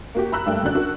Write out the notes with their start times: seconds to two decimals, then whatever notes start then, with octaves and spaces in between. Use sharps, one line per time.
0.15 A#3 F#4 G4
0.32 A#5 B5 E6 F#6
0.46 G2 G3 A3 A#3 G5
0.63 D3 C#4 F#4 D5 F#6
0.74 D4 F#4 A#4